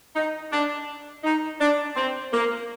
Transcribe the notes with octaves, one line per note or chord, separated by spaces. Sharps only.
D#4
D4
D#4
D4
C4
A#3